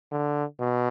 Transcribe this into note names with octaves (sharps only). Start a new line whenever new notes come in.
D3
B2